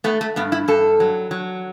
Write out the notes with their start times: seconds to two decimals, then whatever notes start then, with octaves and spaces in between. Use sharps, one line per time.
0.04 A3 B3
0.21 A3
0.36 G2 B3
0.52 E4
0.68 G2 A4
1.00 F#3
1.31 F#3